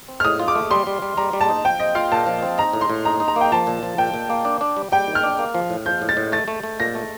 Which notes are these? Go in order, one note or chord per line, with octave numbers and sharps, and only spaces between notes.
C4
F6
A2 D#6
F4
D6
A3
G3 C6
G3
G3
G3 A#5
G3
A5
D#4
F3 G5
C4 D#5
F4 F5
A#2 A5
F3
C4
D#4 A#5
A2
C6
A2
D#4 A#5
D#4
A#5
A#3 G5
F3 A5
A#2
F3
A#2 G5
A#2
A#3
D4
D4
G3
G3 G5
D#3
F6
D4
A#3
F3
A2
F3 G6
A2
A6
A2
A3 A6
A3
A3
A#2 A#6
A3